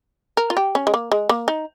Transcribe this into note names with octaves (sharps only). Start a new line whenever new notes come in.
A#4
F4
G4
C#4
G#3
A#3
G#3
A#3
D#4